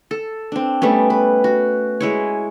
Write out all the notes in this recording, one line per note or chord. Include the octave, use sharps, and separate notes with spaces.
A4
C4 D4
G3 A3 B3 C#4
B4
F#4
G#3 E4 C#5